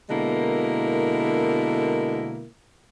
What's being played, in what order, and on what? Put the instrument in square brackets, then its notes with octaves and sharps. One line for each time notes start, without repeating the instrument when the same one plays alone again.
[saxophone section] B2 D3 G#3 A#3 E4 A#4